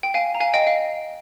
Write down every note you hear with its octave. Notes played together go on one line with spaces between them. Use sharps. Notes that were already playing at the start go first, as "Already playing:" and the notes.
G5
F5 G#5
A#5
F5 G#5
D#5 G5
F5